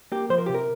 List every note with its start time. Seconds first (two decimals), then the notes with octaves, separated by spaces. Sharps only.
0.12 A#3 G4
0.30 F3 C5
0.38 A#4
0.46 C3 G4
0.54 A#4